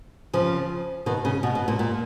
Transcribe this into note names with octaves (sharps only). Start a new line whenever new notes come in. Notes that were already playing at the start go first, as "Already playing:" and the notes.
C#3 F3
B2 D#3
C#3
B2
B2
A#2
A#2